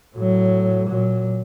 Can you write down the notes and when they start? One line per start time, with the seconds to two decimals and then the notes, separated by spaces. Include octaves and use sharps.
0.16 A2 F#3
0.89 A#2 F#3